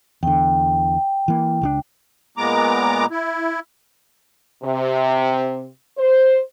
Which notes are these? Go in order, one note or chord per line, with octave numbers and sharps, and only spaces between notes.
E2 D3 G5
E3 A#3
C#2 G3 D4
A#2 G#3 B3 A#5 D6
E4
C3
C5